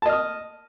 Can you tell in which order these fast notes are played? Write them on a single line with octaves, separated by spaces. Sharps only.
A5 D#5 F6 D#6